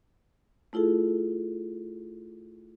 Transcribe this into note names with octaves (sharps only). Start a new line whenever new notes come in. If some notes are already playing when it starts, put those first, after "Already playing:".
A3 E4 F4 G#4 A4